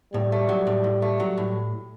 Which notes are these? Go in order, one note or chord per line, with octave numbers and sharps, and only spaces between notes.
A2 G3
A3
F#3
A2
A2
A3
F#3
A2